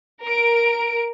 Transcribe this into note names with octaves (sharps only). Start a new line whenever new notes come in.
A#4 D7